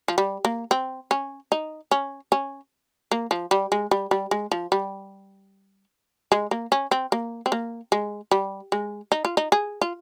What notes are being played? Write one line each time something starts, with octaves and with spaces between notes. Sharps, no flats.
F3
G3
A#3
C4
C#4
D#4
C#4
C#4
A#3
F3
G3
G#3
G3
G3
G#3
F3
G3
G#3
A#3
C#4
C4
A#3
C4
A#3
G#3
G3
G#3
D#4
F4
D#4
G#4
F4